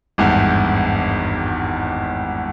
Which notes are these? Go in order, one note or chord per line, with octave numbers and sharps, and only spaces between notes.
G#1 E2 G2